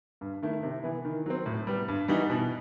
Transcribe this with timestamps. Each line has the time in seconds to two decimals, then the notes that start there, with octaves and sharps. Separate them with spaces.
0.21 G2
0.42 D#3 A3 E4
0.63 C3
0.83 E3 B3
1.05 D#3
1.26 F#3 C4
1.46 A2
1.67 G3 B3
1.88 G2
2.08 E3 G3 D#4 F#4
2.30 B2